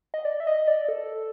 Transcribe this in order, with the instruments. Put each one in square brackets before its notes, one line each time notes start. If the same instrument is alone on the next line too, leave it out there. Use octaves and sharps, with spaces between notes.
[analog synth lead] D#5
D5
E5
D#5
D5
A4